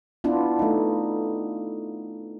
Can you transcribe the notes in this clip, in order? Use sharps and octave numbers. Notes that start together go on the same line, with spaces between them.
B3 D4 E4 F4
A3 D#4